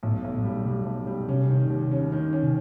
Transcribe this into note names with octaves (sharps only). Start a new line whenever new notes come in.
B1 A2
B1
A#2
G3
B2 G3
B1
G3
C3 C#4
D#3
D#2
C#4
D#3
C#4
C3